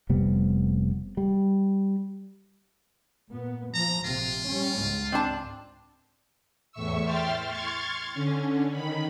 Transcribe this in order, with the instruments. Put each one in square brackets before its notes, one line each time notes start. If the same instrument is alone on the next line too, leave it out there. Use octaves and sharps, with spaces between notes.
[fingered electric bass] F1 C3 G3 B3
G3
[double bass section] A#2 B3
[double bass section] F3 [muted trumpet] A#5
[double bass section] A#1 C3 [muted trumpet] F4
[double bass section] G3 C#4
C#2 G#2
[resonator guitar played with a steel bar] C4 D4 A5
[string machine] E2 A2 E5 C#6 E6
E5 G5 C6 F6 A6
C6 C#6 F6 G#6 A6
D3 C#4
D#3 B5